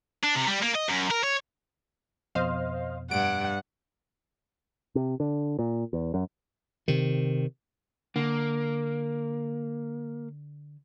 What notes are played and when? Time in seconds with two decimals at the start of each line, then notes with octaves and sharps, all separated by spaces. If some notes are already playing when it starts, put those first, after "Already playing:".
0.24 D4
0.36 C3
0.48 G3
0.63 A#3
0.76 D#5
0.89 F#2
1.11 A#4
1.23 C#5
2.35 F2 B2 C5 D#5 F5
3.11 G2 F#5 D7
4.95 C3
5.20 D3
5.59 A#2
5.93 E2
6.14 F#2
6.88 C3 D#3
8.16 D3 A#3